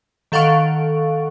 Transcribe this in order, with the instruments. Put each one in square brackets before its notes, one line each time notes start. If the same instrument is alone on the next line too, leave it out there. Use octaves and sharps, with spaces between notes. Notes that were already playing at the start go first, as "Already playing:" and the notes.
[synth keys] D#3 A4 F5 F#5 C#6 D7